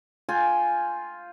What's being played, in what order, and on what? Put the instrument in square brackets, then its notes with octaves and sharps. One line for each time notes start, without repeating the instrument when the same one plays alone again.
[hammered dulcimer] F4 G5 G#5